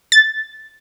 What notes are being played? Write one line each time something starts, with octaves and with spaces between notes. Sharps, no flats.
A6